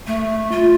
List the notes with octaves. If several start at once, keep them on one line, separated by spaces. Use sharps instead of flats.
A3
F4